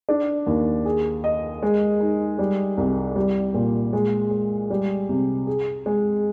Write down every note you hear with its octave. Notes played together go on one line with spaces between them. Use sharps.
D4
D#2
G#4
D#5
G#3
D#4
G3
C2
G3
A#2
G#3
G#3
G3
C3
G#4
G#3